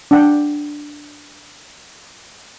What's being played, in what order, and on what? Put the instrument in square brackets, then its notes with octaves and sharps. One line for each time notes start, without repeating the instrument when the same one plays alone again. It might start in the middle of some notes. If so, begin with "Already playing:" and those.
[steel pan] D4 F#5 G5